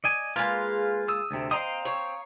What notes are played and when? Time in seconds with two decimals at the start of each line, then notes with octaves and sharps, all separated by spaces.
0.04 D5 D#5 G#5
0.36 G#3 A#3 F4 B4 F5
1.08 D#6 E6
1.31 D2 C3
1.51 C4 D#5 F5 A#5 D#6
1.85 C#5